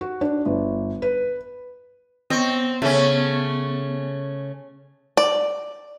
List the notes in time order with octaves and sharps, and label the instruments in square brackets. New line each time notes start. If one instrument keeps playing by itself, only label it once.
[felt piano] F#4
D4
G1
B4
[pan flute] B3 [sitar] C4 [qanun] D#5 C#6
[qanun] C#3 [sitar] A3 C#4
[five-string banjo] D5